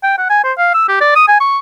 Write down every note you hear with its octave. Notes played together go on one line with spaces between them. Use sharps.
G5
F#5
G#5
C5
F5
E6
G4
D5
D#6
G#5
C#6